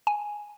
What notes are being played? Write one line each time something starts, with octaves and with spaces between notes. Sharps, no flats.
G#5